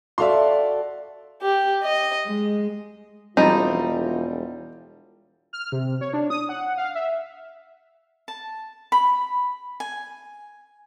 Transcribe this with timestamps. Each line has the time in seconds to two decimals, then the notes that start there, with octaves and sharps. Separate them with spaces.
0.18 F#4 A4 D5 E5 F5 C6
1.42 G4
1.84 D#5
2.27 G#3
3.37 E1 F3 G3 C4 D#4 F4
5.53 F6
5.72 C3
6.01 C#5
6.14 D4
6.30 D#6
6.49 F#5
6.77 F5
6.95 E5
8.28 A5
8.92 B5
9.80 G#5